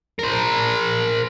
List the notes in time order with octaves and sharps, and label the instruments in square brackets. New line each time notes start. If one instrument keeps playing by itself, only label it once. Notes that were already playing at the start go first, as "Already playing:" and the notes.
[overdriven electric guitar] A#4 C5